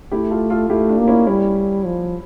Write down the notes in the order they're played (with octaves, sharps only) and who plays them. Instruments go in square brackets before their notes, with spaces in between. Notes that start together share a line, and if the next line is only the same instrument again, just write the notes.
[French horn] A3 [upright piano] E4 G4
[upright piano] F4 A4
F4 A4
[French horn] A3 [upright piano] E4 G4
[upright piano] D4 F4
[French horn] A#3
[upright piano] C#4 E4
[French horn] G3 [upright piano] C#4 E4
[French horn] F3